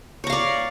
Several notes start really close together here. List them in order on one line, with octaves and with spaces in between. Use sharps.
C#5 A#5 F5 D5